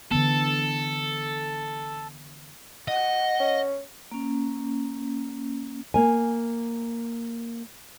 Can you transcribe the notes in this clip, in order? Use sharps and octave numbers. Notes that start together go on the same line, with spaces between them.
D3 E3 B3 A4
D#5 F#5
C#4
A#3 C#4
A#3 G#5